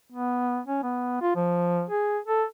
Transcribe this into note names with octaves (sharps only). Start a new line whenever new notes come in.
B3
C#4
B3
F4
F3
G#4
A4